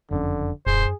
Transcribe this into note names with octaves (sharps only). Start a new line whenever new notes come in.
F#1 F2 D3 C#4
D#1 F#2 G#4 C5